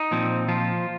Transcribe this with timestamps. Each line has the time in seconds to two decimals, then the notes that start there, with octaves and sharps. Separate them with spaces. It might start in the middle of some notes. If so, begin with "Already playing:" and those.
Already playing: D#4
0.11 A#2 F3 C4
0.48 F3 F4